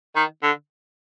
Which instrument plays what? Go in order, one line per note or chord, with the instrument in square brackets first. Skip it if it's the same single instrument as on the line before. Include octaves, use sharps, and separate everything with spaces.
[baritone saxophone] D#3
D3